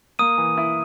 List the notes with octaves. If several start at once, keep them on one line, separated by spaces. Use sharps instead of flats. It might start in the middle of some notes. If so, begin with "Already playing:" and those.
A#3 D#6 D#7
E3
E4